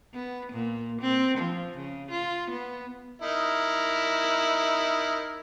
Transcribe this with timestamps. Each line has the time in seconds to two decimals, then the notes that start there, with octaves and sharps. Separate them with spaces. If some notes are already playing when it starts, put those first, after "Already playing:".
0.14 B3
0.52 A#2
1.01 C4
1.38 F3
1.77 C#3
2.11 F4
2.50 B3
3.22 D#4 E4 A#4